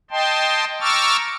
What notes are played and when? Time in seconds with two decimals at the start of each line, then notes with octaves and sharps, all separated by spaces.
0.11 D#5 G5 A5 C6
0.81 A#5 C#6 D6 E6 F6 A6